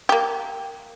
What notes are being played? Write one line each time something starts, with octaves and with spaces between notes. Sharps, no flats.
A#3 G4